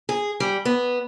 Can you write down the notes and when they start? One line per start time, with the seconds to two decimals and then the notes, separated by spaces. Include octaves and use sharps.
0.09 G#4
0.40 G3
0.65 B3